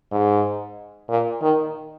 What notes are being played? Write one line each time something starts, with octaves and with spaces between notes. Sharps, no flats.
G#2
A#2
D#3